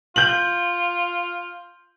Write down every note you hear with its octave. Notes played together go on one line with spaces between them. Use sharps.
F4 G6 F#7